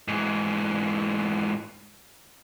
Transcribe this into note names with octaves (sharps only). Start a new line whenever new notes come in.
G#2 E3